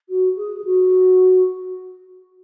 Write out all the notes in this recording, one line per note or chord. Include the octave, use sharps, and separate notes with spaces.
F#4
G#4
G#4
F#4